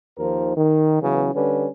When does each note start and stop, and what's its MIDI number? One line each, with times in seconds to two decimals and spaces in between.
0.18 0.54 39
0.18 0.54 51
0.18 0.54 53
0.18 0.54 70
0.18 0.54 72
0.56 0.98 51
1.02 1.32 49
1.02 1.32 52
1.02 1.32 54
1.02 1.32 59
1.02 1.32 61
1.34 1.67 50
1.34 1.67 55
1.34 1.67 61
1.34 1.67 71